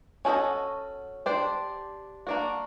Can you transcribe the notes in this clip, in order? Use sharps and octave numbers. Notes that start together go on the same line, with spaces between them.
C#4 F#4 A4 C5 D#5
D4 G4 C5
A#3 D4 F#4